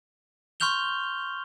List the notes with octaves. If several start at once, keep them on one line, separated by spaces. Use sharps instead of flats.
C6 C#6 F6 G6 F7 G7